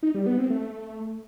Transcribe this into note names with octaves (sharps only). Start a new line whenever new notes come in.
D#4
G3
B3
C4
A3